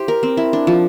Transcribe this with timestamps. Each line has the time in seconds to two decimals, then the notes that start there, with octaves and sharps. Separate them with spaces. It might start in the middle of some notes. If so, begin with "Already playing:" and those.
Already playing: E4 G4 C5
0.08 A#4
0.23 C4
0.37 E4
0.53 D4
0.67 F3